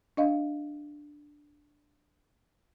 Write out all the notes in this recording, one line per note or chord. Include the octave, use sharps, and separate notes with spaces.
D4 D#5 F5